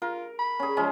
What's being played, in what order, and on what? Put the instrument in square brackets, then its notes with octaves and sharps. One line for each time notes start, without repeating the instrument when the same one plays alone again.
[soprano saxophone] F4 [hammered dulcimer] A#4
[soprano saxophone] B5
[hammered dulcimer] C#4 G#4
F3 G#3 C#4